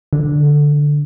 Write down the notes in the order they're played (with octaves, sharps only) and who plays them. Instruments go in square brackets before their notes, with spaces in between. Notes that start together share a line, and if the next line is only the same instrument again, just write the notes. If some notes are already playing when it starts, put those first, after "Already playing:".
[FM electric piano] D3